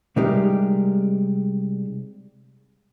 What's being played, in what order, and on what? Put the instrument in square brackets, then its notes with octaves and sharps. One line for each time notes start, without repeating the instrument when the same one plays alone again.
[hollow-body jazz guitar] C3 G3 G#3 D#4 G4 A#4